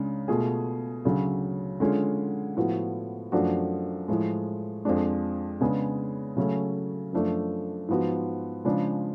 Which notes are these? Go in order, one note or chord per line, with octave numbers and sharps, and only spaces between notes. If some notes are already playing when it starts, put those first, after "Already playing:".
Already playing: C#2 C#3 G#3 D4
B2 A3 F4 G#4
D2 C#3 F#3
D3 G#3 C#4 F4 G#4
A2 F3 B3 F#4
F#2 F3 A3 D4 F#4
A2 F3 G#3
F2 F3 G#3 D4
C#3 G#3 B3 D4 G#4
C#3 F#3 A3 C#4
F#2 F3 A3 D4
G#2 F3 B3 F#4
C#3 F3 G#3 D4